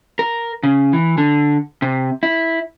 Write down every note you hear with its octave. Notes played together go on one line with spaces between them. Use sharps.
A#4
C#3
E3
D3
C3
E4